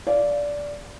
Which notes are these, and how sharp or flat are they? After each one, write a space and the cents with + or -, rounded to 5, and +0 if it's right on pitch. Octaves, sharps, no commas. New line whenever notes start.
D5 -15 F5 +0